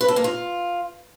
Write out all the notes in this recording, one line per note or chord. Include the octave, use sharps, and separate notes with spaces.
B4
A4
A#3
F4